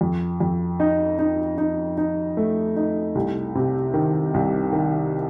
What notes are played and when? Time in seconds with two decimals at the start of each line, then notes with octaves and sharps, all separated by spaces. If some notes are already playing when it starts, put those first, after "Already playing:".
0.01 F2
0.40 F2
0.80 D#4
1.19 D#4
1.58 D#4
1.97 D#4
2.37 A3
2.76 D#4
3.15 C2
3.55 C3
3.94 D#3
4.34 C2
4.72 D#3